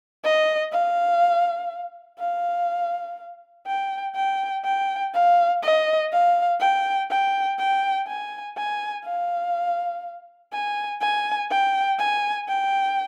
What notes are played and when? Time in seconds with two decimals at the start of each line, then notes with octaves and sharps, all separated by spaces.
0.24 D#5
0.72 F5
2.19 F5
3.67 G5
4.15 G5
4.65 G5
5.14 F5
5.63 D#5
6.12 F5
6.60 G5
7.10 G5
7.59 G5
8.07 G#5
8.57 G#5
9.05 F5
10.53 G#5
11.01 G#5
11.51 G5
11.99 G#5
12.48 G5